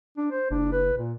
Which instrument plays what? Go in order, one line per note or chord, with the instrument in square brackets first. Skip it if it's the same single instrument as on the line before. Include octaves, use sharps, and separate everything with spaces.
[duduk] D4
C5
[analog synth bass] F#1 [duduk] D4
[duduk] B4
A#2